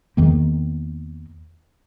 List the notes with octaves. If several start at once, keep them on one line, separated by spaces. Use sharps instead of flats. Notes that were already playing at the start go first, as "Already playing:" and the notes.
E2 D#3 A#3